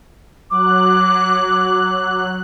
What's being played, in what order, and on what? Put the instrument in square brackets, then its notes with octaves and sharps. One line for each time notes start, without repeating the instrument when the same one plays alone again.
[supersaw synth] F#3 F#6 [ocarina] D6